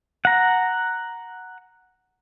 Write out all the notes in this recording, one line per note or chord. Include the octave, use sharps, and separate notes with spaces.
F#5 A#5